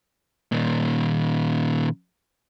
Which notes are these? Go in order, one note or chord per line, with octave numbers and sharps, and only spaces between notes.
A#2 D#3